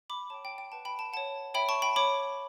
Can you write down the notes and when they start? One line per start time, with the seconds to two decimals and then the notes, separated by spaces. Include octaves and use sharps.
0.10 B5 D6
0.30 C#5 G5 A5
0.45 G5
0.58 G5
0.72 B4 F#5 A5
0.85 G5 B5
0.99 A5
1.13 C#5 F#5 A5
1.54 C#5 E5 G5 B5
1.69 A5 C#6
1.82 G5 B5
1.96 C#5 G5 B5 D6